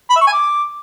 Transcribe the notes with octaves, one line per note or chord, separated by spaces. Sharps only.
B5
E5
C#6
G#5
D6